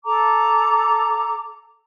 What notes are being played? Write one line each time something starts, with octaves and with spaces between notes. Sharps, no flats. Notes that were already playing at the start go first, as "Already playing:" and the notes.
A4 A#5 D6